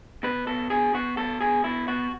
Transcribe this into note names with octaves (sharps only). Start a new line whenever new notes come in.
B2 B4
B2 A4
B2 G#4
B2 F#4
B2 A4
B2 G#4
B2 E4
B2 F#4